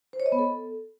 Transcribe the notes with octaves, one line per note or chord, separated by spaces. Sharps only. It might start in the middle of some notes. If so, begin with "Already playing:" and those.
C5
C#5
D#5
B3
A4